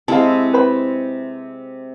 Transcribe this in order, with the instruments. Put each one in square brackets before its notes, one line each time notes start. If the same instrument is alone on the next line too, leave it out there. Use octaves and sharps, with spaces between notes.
[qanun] C3 G#3 E4 [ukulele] F5 A5
[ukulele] B4 C5 B5